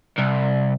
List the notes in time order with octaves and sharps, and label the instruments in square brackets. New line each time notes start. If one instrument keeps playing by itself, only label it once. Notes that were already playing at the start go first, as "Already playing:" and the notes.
[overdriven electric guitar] C2